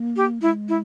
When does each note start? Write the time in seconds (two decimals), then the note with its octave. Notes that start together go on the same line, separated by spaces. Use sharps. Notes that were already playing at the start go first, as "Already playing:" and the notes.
Already playing: A#3
0.16 G4
0.42 G#3 E4
0.69 E4